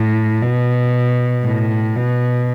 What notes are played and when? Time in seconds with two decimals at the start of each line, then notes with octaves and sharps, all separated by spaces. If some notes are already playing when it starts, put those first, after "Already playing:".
Already playing: A2
0.42 B2
1.45 A2
1.96 B2